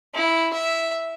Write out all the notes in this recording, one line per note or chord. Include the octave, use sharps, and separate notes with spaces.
E4
E5